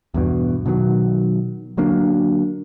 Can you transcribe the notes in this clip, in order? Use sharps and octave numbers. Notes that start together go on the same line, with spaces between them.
E2 G2 B2
B2 D#3 E3 F#3
D3 F#3 A#3 D4